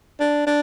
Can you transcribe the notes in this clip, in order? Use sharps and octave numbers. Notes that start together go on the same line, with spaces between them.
D4
D4